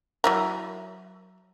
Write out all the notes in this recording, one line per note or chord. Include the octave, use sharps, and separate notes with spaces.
F#3 E4 A#4